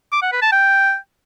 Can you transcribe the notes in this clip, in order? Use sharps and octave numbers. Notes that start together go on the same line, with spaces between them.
D6
F#5
B4
A5
G5